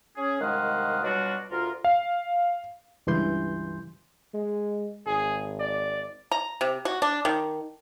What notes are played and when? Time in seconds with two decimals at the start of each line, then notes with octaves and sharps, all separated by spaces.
0.17 C#4 G#4
0.41 C2 D#3 G#3 F5 F#5 D#6
1.03 B2 F#3 G3 D4 F4 F#4
1.51 D2 F4 A#4
1.84 F5
3.07 C#2 G2 E3 C6 G6
4.34 G#3
5.06 G#1 G#4
5.60 D5
6.32 A#5
6.61 C3
6.85 F#4
7.02 D4
7.25 D#3